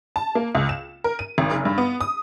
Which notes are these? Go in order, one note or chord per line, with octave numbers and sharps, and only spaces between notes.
A5
A#3
C#2
E7
A#4
D#7
G#1
F#1
G2
B3
D#6